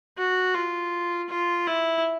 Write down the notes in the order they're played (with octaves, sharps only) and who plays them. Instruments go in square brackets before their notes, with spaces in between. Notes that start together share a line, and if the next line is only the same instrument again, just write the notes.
[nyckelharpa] F#4
F4
F4
E4